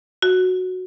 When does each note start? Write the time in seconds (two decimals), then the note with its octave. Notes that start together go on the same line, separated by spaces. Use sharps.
0.22 F#4